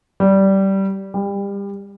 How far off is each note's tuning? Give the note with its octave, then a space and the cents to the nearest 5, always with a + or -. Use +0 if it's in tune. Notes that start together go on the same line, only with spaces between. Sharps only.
G3 -15
G3 +30